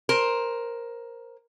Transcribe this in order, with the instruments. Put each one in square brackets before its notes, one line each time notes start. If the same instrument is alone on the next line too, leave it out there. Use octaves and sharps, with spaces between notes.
[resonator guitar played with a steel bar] A#4 C5